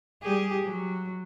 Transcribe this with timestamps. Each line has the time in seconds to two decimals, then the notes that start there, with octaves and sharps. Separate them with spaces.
0.22 G3 G4 G#4
0.63 F#3